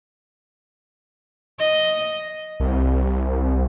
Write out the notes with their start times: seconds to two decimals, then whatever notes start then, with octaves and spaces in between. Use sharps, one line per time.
1.59 D#5
2.60 C2